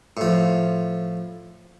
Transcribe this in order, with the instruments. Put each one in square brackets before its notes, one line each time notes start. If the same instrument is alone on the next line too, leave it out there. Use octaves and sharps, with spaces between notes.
[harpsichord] A2 F3